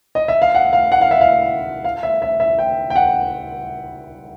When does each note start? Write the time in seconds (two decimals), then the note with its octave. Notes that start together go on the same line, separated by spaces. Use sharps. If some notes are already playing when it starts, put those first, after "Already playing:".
0.15 D#5
0.28 E5
0.42 F5
0.55 F#5
0.73 F5
0.92 F#5
1.01 F5
1.11 E5
1.21 F5
1.85 F5
2.03 E5
2.22 E5
2.40 E5
2.59 G5
2.90 G5
2.96 F#5